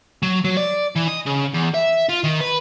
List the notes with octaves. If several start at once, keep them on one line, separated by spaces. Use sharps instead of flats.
F#3
F#3
D5
E3
D#5
C#3
E2
E5
F4
D#3
B4